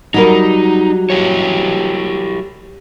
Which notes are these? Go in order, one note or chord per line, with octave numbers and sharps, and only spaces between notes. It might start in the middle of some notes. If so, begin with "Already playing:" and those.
F#3 G3 D#4 A#4
E4 G4 C#5